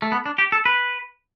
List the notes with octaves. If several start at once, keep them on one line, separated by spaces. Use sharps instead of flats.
A3
B3
D4
G4
A4
B4